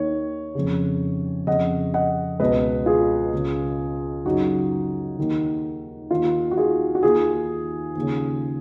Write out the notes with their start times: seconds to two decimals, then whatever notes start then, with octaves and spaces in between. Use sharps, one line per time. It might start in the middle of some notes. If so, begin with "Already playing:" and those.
Already playing: D#2 D#3 C#5
0.55 F2 C#3
1.47 F2 C#3 D#5 F#5
1.94 D#5 F#5
2.40 C#2 B2 B4 D#5
2.86 F4 G#4
3.33 C#2 C#3
4.25 F#2 C#3 D#4 F#4
5.18 D#2 D#3
6.11 D#2 D#3 F4
6.51 F#4
6.57 F4 G#4
6.95 F#4
7.03 D#2 D#3 F4 G#4
7.95 D#2
8.00 C#3